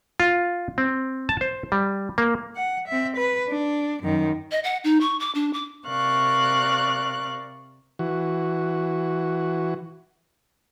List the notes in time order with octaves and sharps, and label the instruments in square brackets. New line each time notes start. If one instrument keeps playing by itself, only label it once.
[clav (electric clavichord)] F4
C4
A5
C5
G3
A#3
[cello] F#5
C4 E5
B4
D4
F#2 D#3
[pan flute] D#5
F#5
D#4
C#6
D6
D4
D6
[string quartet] C3 A#4 D5 F5 C#6 F#6
[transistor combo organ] E3 F#4